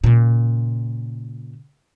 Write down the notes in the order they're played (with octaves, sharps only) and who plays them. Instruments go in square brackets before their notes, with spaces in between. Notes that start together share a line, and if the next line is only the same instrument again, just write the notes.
[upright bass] A#2 C#3